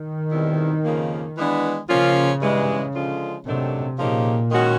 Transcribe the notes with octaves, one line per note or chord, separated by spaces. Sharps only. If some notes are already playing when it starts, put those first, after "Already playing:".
Already playing: D#3
E2 B2 G3 C4 E4
F2 C#3 F3 A#3
E3 G#3 B3 D4
C#3 F3 A#3 C#4 F4
G2 E3 G#3
D3 F3 G#3 C#4 F4
F#2 C3 D#3 F#3 A3 D4
A#2 C#3 F3 A#3 D#4 G4
D#3 G#3 C#4 F#4